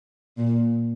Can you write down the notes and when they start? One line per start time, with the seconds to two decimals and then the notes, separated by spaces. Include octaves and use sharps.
0.38 A#2